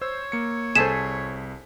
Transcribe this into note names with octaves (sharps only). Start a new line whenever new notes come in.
C5 C#5 E6
A#3 C#7
C2 G#4 A4 C5 B6 E7